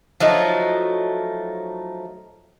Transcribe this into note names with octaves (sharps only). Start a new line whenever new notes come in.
F3 F#3 A3 D#4